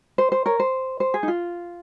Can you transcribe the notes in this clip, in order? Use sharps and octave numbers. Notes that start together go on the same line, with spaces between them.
C5
C5
A#4 C#5
C5
C5
G#4
D#4
F4